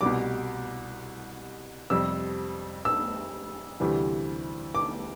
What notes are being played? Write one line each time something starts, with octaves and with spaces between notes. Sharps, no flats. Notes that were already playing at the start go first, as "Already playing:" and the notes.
C2 B2 G3 D6
F2 C3 G3 E6
E6
D2 C3 E3 G3
D6